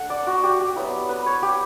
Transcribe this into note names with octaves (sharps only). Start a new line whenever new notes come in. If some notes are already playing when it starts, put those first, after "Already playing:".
Already playing: A3 D4 F#5
D5
F#4
G4
G4
F#3 B3 E4
B4
C#5
G4